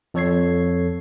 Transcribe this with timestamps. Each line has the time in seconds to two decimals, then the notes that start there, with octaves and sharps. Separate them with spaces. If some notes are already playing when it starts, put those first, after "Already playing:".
0.14 F2 A4 C#5 G#6 C7